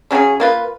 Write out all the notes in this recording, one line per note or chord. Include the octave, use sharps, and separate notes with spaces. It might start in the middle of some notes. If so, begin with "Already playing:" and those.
C#3 F#3 C#4 G#4
A#3 F4 B4